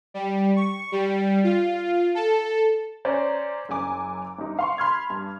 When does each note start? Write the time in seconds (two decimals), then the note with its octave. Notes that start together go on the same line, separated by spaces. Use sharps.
0.14 G3
0.56 C#6
0.92 G3
1.44 F4
2.15 A4
3.05 C#4 C5 D5 A#5
3.69 F#1 F#2 G#5 D6
4.38 G1 D#4
4.59 F5 C6 C#6
4.78 B5 C6 F6 G#6
5.10 G2